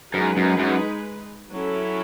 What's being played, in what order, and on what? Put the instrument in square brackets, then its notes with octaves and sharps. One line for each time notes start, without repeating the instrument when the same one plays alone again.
[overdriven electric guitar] F#2 [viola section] G#3 D#4 G#4 B4
[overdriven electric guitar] F#2
F#2
[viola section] F#3 C#4 E4 A4